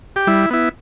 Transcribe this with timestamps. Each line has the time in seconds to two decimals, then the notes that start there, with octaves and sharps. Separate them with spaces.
0.16 G4
0.27 G3 E4
0.50 B3 E4